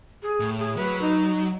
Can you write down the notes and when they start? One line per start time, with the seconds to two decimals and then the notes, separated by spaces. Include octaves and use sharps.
0.23 G#4
0.40 A2
0.60 G#4
0.77 F#3 B4
1.01 D#4